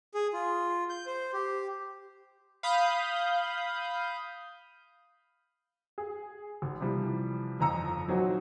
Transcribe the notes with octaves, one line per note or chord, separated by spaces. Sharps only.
G#4
F4
G6
C5
G4
F5 B5 D#6 G6
G#4
G#1
C3 E3 F3 G3
G1 F2 F3 A#5 E6 C#7
A#2 F#3 C4 D#4 F#4